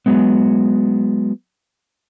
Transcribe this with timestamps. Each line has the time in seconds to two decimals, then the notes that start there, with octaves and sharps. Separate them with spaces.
0.06 F#3 G#3 B3